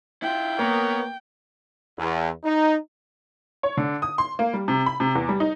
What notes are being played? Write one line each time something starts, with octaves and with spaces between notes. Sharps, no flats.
E4 F4 G5
A#3 B3 A#4 C#5
E2
D#4
C#5
D3
D#6
C6
A#3
G3
C3
B5
C3
E2
G3
D#4